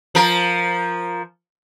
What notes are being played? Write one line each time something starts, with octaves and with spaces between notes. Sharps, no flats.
F3 A#4